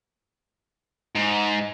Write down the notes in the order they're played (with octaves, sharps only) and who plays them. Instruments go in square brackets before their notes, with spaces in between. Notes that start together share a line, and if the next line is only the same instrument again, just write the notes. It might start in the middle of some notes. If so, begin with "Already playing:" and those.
[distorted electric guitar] G#2